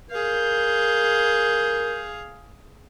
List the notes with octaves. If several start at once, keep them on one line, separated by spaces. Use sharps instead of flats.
G#4 A#4 F5 G6